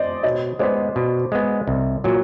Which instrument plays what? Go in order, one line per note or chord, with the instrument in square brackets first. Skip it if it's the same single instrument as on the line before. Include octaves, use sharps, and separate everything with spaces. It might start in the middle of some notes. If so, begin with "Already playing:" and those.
Already playing: [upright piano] C5 D5 D#5
[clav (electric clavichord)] B2 [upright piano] C#5 D#5
[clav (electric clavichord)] G#3 B3 [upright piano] C5 D5
[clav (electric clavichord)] B2
G#3 B3
C2
A#2 F#3